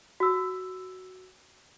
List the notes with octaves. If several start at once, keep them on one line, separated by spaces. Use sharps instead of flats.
F#4 E6